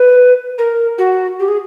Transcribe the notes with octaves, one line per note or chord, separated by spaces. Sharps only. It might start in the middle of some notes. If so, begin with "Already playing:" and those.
Already playing: B4
A#4
F#4
G4
G#4